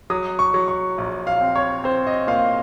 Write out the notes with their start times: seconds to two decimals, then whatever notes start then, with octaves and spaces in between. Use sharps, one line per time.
0.10 F#3 D#6
0.39 C#6
0.54 F#3
0.68 C#6
0.98 A#1
1.27 F5
1.41 C4
1.56 C#5
1.84 C4 C5
2.07 D#5
2.27 A#2 F5